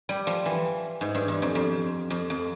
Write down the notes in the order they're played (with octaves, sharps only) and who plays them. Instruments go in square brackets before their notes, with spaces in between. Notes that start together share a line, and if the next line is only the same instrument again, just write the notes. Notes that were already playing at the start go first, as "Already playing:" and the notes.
[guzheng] G3
F3
E3
G#2
G2
E2
F2
F2
F2
F2